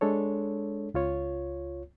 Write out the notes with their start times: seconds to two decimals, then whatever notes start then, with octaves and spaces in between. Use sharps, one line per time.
0.01 G#3 D4 A4 C#5
0.94 C#2 F4 C#5